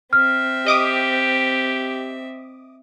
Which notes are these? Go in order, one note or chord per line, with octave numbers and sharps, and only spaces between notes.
C4 E5 F6
G4 D#5 D6 D#6